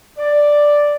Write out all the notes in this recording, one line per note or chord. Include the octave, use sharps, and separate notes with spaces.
D5